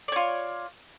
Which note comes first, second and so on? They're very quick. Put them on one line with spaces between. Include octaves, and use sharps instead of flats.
D5 C#5 F4